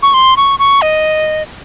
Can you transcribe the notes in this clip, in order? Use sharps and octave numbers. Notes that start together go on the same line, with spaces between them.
C#6
C6
C#6
C#6
D#5